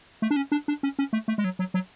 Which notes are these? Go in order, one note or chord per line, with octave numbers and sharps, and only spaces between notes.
A3
D4
C#4
D4
D4
C#4
C#4
A3
A3
G#3
F#3
F#3
F#3